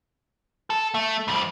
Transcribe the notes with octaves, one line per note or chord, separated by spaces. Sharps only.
A4
A3
F2 G3